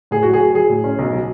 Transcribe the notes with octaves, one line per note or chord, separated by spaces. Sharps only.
A2 G#4
F#3 F#4
G#4
F#3
F#3 G#4
A2
C#4
B1
F#3